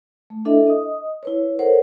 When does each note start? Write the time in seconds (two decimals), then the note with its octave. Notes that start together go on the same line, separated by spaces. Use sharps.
0.30 A3
0.45 D4 E4 A4 D#5 E5
0.67 D#5 D#6
1.23 E4 B4 C#5
1.59 A4 A#4 C5 C#5 F#5